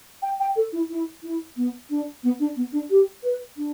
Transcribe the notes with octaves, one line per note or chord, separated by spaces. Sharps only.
G5
G5
A4
E4
E4
E4
B3
D4
B3
D4
B3
D4
G4
B4
D4